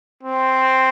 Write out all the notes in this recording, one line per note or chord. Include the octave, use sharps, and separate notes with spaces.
C4